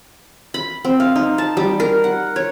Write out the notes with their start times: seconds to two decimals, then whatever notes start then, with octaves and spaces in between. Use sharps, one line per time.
0.54 B5
0.85 C4
1.00 F5
1.16 D#4
1.38 A5
1.57 G3
1.80 A#4
2.04 F#5
2.36 C#5